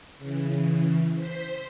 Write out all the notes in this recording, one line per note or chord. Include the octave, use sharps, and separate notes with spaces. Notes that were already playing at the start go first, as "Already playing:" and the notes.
C#3 E3
C5 B6